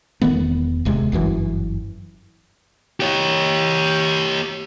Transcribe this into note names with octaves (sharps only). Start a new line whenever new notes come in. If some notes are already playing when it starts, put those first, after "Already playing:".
E1 D#3 A3 B3
D#1 C#2 C3 G#3
G1 F#2 A2 E3
G4 C#5